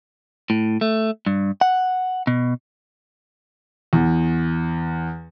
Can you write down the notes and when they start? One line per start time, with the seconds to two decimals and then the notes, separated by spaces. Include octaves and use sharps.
0.50 A2
0.81 A3
1.27 G2
1.61 F#5
2.27 B2
3.93 E2